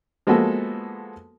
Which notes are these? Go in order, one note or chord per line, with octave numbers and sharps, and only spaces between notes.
F3 G#3 A#3 B3 F#4 A4